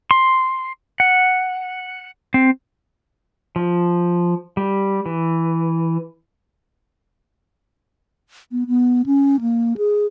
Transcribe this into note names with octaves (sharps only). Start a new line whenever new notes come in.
C6
F#5
C4
F3
G3
E3
B3
B3
C#4
A#3
G#4